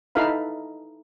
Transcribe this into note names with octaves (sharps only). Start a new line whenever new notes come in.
D#4 E4 A4 B4 F5 B5